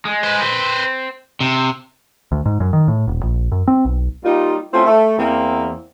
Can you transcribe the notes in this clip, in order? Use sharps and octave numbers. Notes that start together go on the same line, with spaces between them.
G#3
B4 C5
C4
C3
D2
G#2
F#2
D#3
A2
D#1
A#1
F#2
C4
B1
G3 A#3 D#4 F4
A3 C4 C#4 E4 F4
A3
E2 E3 A#3 C4